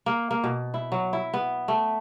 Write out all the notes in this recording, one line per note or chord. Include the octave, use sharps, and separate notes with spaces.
A#3
A#3
B2
E4
F#3
E4
B3
A3